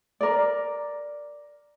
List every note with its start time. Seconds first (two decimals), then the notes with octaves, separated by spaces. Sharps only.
0.21 A#4 D5